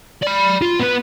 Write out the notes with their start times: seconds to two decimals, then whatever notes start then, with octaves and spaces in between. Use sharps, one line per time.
0.22 D5 B5
0.62 F4
0.79 B3 B4